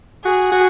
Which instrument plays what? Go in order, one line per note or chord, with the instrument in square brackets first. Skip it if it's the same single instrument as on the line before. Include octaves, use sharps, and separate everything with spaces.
[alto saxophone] F#4 [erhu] G#4
[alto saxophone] F#4